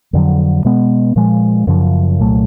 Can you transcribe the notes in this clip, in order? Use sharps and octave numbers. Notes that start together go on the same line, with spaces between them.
F2 D3 F#3
B2 G#3 B3
A#2 F3 G#3
F#2 C#3 F3
C2 A#2 F#3 A3